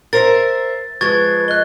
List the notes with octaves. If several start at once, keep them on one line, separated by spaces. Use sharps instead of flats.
A#4 C5 E5 A6
F3 G#3 B4 C#6 G#6 A6
D#5 F#6 G7